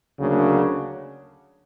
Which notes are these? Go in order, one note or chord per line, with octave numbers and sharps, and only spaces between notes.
D2 C#3 F#3 A#3 D4